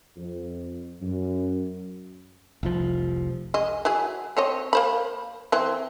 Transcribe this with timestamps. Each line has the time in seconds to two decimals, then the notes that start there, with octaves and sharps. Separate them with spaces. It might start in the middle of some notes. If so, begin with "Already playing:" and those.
0.17 F2
1.01 F#2
2.63 F1 C2 F3
3.54 G#3 D#5
3.85 F#3 E4 G#4
4.37 C4 C#5 D#5
4.73 A#3 C5 B5
5.52 E3 C4